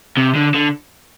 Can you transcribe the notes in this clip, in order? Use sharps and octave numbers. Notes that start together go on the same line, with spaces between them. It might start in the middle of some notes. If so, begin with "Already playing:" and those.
C3
D3
D3